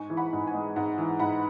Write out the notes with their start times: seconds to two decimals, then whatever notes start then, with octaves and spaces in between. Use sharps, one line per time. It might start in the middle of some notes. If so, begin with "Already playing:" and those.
Already playing: G#2 G#5 C#6
0.10 E3
0.17 F#5 B5
0.33 G#2
0.47 G#5
0.54 G#3
0.76 G#2 F#5
0.98 E3
1.20 G#2 F#5 B5